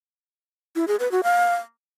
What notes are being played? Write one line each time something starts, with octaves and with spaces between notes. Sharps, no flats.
E4
G#4
B4
F#4
F5